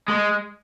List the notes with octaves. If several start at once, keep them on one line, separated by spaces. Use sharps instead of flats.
G#3